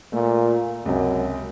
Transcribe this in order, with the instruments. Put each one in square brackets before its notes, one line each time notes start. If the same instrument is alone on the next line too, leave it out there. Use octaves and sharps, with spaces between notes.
[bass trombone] A#2 [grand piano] A3
[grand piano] C#2 C3 [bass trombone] F#2